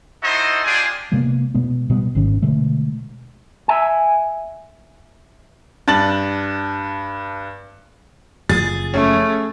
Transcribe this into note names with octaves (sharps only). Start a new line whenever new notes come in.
D#4 E4 F#4 A4 C5 D#5
D4 F4 G4 G#4 G#5
C3 G#3 A#3 B3
B2 G#3 B3
B2 G3 B3
G#1 G#2 D#3 C#4
B2 D3 G#3 A3
E5 G#5
G2 A5 A6 F#7
F#1 F3 G#4 A6
A3 C#4